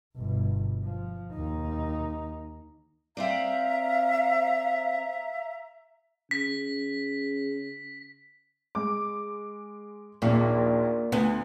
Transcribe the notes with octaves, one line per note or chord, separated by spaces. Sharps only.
G1 B2
F3
D#2 D#4
C4 C5 D5 E5 F5 A#5
C#3 B6
G#3 D6
A#1 D#2 A#2
D2 B3